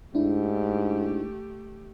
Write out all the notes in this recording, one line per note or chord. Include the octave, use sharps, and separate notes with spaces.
G#2 A3 D4 E4 G4